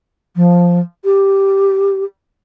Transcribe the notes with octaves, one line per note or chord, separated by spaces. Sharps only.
F3
G4